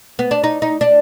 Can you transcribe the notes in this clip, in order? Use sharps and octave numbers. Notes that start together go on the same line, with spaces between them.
B3
D4
D#4
D#4
D4